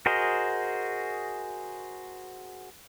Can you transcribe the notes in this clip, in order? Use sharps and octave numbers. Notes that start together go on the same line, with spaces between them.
F#4 G#4 A#4 C5 D#5